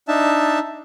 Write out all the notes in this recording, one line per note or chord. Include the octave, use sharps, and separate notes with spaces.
D4 D#4 E5 A5